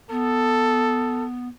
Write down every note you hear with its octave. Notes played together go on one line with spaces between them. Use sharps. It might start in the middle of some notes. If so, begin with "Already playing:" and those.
B3 A4